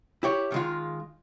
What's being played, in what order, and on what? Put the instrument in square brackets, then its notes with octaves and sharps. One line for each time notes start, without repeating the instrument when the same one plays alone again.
[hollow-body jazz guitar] E4 G4 C#5
D#3 G#3 F4